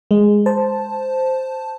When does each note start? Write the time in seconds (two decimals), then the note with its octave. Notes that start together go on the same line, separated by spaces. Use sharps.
0.11 G#3
0.46 C5 A5